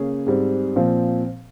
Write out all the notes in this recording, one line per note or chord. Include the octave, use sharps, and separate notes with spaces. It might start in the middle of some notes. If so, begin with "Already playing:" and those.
Already playing: C#3 A#3 C#4 G#4
G#2 G3 C4
A#2 F3 C4